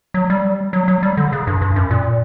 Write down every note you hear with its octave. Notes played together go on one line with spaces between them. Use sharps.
F#3
G3
F#3
F#3
G3
D3
C#3
G2
G2
F#2
A#2